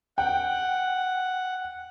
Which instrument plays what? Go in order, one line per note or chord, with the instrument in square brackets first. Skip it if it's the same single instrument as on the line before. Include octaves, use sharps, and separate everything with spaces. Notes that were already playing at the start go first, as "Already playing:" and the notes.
[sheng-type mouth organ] F#5 [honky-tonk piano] G5